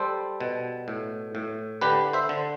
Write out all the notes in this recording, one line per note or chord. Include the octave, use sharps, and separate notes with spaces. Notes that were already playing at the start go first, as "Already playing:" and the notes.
Already playing: G3 A4 C5
B2
A2
A2
D3 G4 B4
C5 E5
D3